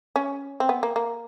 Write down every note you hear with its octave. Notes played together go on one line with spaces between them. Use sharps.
C#4
C4
B3
A#3
A#3